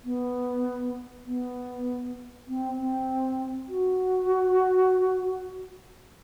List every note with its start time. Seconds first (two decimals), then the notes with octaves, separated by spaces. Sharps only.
0.04 B3
1.26 B3
2.47 C4
2.77 C4
3.68 F#4